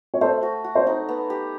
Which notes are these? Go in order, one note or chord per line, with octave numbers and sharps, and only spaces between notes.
C#5
A3 C5
F#4
F#4
C5
D#4 C#5
B3
G4